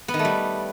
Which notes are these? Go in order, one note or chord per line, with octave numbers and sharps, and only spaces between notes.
B3
D#3
A3
G3